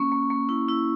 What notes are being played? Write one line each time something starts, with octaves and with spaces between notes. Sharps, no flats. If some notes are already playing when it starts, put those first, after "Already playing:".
Already playing: A#3 C#4 C#6
A#3
A#3
E4
E4